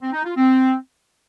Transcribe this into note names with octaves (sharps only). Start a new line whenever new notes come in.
C4
D#4
F4
C4